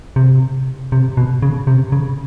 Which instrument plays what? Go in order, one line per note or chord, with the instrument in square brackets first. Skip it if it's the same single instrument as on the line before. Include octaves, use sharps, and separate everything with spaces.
[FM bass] C3
C3
B2
C#3
C3
C#3